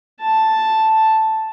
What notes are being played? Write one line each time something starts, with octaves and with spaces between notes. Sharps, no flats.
A5